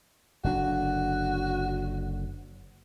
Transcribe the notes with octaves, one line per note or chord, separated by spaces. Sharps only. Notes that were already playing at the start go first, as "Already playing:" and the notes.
F#1 D3 D4 F#4